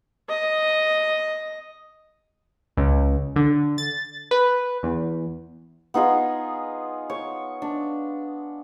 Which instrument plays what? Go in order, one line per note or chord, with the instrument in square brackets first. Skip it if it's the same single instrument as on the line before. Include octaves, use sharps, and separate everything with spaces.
[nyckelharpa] D#5
[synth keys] C#2
D3
A6
B4
E2
[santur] B3 D#4 F4 G#4
C#5
D4